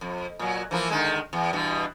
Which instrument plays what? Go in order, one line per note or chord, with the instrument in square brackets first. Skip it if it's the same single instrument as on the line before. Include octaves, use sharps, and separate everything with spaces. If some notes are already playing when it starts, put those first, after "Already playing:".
[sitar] F2
A#2 F#3
E3 F3 A#3
D3 D#3 G#3
E2
G2 B2 E3